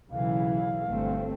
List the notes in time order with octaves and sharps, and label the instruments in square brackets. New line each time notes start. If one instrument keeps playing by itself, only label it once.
[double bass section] B1 C#3 E3 [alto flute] F5
[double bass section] G1 A3 C4